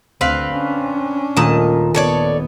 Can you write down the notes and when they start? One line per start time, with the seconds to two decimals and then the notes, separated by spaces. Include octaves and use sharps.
0.21 D2 D3 C4 B4 F5
0.52 C#4 D4
1.37 D#1 A#2 A3 A5 D#6
1.95 A#2 B3 A4 C#5 D5